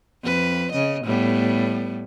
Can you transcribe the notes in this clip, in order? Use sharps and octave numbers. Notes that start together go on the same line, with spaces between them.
F2 B4
C#3 D#5
A2 G3 B3